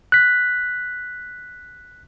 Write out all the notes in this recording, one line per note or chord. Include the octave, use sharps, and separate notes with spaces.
F#6 B6